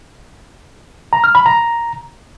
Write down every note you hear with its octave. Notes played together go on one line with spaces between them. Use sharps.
A#5
F6
B5
A#5